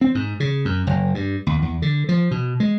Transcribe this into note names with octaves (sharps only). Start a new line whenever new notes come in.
C4
G#2
C#3
F#2
F#1
G2
D#2
E2
D3
F3
B2
G#3